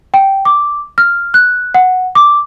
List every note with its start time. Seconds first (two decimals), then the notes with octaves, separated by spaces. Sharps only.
0.14 G5
0.45 D6
0.98 F6
1.34 F#6
1.75 F#5
2.15 D6